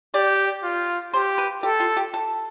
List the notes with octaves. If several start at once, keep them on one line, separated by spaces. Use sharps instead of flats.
G4 D5
F4
G4 C5
B4
G4 A4
F4
G4
A4